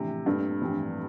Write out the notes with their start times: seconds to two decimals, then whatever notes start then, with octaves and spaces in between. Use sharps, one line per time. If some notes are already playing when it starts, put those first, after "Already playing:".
Already playing: A#1 A2 C3 E3
0.26 G2 A#2 A3 C4
0.62 A#1 A2 E3 G3 C4